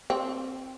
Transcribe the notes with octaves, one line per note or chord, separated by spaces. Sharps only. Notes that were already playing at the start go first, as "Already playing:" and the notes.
C4